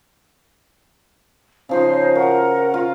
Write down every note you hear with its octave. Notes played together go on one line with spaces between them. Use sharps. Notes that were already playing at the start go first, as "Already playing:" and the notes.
C#3 F3 D#4 C5 F5 C6
F#4 A#4 F#5
F4